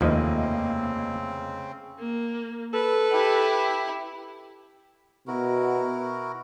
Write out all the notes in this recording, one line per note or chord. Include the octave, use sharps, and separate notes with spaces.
F1 D#2 C#3 F3 A#3 C4 E4 D#5
A#3
A4 B4
E4 G4
B2 E4 F#4 A#4